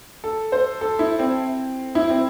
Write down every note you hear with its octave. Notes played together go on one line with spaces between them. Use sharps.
A4
C5
A4
E4
C4
E4
C4